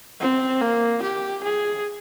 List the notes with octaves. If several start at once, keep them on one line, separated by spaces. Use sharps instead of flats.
C4
A#3
G4
G#4